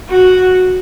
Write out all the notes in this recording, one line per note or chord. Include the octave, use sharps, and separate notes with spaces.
F#4